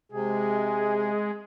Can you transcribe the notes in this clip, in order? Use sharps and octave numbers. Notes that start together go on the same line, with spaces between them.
C3 G#3 G#4